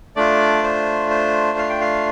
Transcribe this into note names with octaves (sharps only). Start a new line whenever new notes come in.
A3 D4 F4 D5
C5
C5
F5
G5
F5